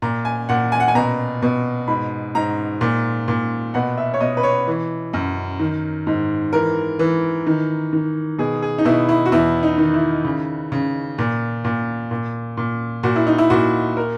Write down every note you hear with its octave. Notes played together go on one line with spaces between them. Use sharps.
A#2 A#5
G#5
A#2 F#5
G#5
F#5
G#5
B2 A#5
B2
G#2 B5
G#2 A#5
A#2
A#2
B2 F#5
E5
C#5
B2 D#5
B4
C#5
E3
F#2
D#3
G#2
E3 A#4
E3
D#3
D#3
B2 G#4
G#4
D#4
B2 E4
E4
F#4
E2 E4
D#4
D#3
E4
C#3
C#3
A#2
A#2
A#2
A#2
A#2 F#4
E4
D#4
E4
A#2 F#4
A#4